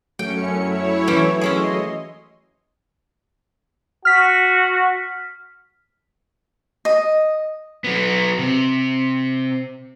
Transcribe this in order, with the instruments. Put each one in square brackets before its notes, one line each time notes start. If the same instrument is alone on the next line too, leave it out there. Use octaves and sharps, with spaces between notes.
[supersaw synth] F#2 C#4 C#7 [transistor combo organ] F#3 A3 [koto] G5
[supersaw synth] E4 C#5
[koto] E3 C#4 G5
[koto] C#4 E4 G#4 [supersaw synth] D#5 C6
[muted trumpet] F#4 [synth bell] F6 B6
[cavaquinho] D#5
[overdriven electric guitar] F#3 B3
C3